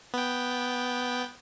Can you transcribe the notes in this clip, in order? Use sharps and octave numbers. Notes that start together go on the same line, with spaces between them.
B3 G5